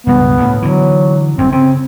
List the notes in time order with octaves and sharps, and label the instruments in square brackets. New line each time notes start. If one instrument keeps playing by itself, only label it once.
[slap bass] C#2 G2 B2 [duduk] B3
[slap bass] D2 A2
[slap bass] D3 E3 [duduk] F#3
[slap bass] G1 F#2 [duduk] C4
[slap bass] C#3 [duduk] C4